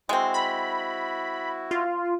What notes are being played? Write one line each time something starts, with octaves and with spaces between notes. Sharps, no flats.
G#3 C4 E4 F#4
B5
F4